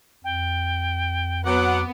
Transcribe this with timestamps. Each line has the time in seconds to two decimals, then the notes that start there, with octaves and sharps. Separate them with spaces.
0.24 F2 G5
1.45 F#3 B3 F#5 D6